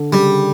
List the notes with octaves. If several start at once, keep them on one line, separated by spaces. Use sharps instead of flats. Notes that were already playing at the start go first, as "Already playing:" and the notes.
Already playing: D3
C#3 G3